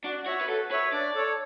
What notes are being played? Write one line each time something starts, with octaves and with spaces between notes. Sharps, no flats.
D4 F#4
F#4 C#5 E5
B4
F#4 A4
B4 C#5 E5
D4 D5
A4 C#5